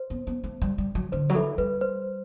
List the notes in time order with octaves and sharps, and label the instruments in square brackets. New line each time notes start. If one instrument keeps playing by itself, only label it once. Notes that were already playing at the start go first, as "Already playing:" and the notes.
Already playing: [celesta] C5
[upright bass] B3
B3
A3
G3
G3
F#3
[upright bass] D3 [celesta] C5
[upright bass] F#3
[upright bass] E3 [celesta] A4
[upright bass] G3 [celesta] B4
[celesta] C5